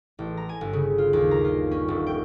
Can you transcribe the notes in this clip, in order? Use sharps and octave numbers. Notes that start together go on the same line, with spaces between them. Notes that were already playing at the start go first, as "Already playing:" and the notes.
A1
A#5
G#5
G1
C#3
F4
D#2
A#5
F4
C#4
D#1
G5